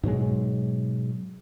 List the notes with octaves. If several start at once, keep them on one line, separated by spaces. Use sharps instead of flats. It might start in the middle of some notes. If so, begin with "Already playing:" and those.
G#2 B2 F#3 G#3